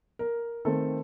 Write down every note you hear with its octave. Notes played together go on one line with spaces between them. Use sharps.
A#4
D#3 A3 C4 A4